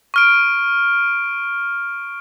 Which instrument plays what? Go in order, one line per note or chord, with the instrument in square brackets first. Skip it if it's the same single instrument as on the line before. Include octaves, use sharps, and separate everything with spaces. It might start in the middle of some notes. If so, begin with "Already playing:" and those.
[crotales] C#6 F6 D7